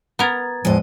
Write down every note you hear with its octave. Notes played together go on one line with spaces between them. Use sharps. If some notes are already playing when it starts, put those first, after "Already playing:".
B3 A#4 A#5 G#6 A6
E2 A2 F3 G#3 D#5